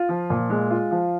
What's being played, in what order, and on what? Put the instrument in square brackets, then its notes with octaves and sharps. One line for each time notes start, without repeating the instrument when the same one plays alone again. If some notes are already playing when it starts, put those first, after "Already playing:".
Already playing: [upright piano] F4
F3
A#2
G#3
F4
F3